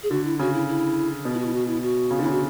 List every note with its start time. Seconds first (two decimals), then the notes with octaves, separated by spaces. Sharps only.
0.03 G#4
0.11 D3 F#4
0.25 E4
0.39 C#3 F#4
0.54 E4
0.69 E4
1.25 B2
1.34 E4
1.39 F#4
1.46 E4
1.54 F#4
1.68 E4
1.83 F#4
2.11 C#3
2.19 D3
2.22 C#3 E4
2.31 F#4